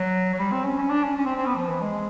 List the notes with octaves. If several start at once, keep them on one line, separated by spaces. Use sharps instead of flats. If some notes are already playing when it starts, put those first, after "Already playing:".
Already playing: F#3
F#3
G3
C4
C#4
C#4
D4
C#4
C#4
C4
C4
B3
F3
E3
G#3